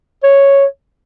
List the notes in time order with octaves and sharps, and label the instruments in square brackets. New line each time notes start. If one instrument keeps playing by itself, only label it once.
[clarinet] C#5